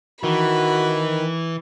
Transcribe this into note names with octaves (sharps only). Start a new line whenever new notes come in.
D#3 E3 F#4 B5